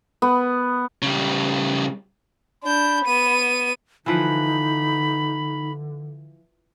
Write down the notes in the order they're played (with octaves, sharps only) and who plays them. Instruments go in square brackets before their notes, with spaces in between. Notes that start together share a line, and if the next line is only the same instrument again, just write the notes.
[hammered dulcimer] B3
[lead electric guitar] C#3 G3
[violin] D4 G6 [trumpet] B5
[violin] B3 D#7
[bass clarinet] D3 [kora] E3 F3 B4 [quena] D#4 [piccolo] B5